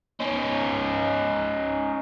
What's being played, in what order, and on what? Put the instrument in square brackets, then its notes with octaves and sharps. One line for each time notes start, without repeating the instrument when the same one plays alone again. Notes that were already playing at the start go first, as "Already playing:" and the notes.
[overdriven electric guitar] C#4 D#4